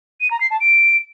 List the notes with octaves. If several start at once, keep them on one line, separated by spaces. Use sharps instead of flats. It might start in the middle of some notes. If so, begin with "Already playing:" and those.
D#7
A#5
C7
A5
D7